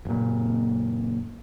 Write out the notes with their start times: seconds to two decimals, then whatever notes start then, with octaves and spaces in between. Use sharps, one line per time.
0.05 F#1 A#2